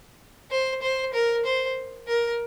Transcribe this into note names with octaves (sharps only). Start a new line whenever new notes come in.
C5
C5
A#4
C5
A#4